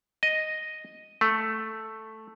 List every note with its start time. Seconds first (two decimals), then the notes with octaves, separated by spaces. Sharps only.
0.23 D#5
1.21 A3